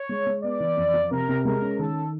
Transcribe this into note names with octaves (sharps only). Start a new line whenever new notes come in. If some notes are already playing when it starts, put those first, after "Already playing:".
Already playing: C#5
G#3
G#3
B3 D5
E3
F2
F3
C3 A#4
C3
G#3 A#4
C#4
D#3 A4